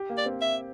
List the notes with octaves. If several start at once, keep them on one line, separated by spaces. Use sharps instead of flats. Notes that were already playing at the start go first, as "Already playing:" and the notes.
Already playing: G4
A#3
D5
C4
E5